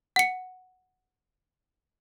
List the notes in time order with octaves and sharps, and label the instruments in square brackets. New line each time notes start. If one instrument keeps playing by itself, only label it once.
[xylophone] F#5 C#7